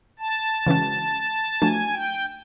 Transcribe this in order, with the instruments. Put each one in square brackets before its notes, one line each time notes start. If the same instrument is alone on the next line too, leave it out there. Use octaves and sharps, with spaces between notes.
[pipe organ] A5
[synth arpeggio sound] C#3 E3 G#3 C#4 F#4
[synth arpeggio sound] F3 A3 D4 F#4 [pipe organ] G#5
[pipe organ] G5